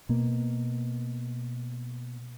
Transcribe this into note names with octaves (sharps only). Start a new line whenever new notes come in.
B2 A#3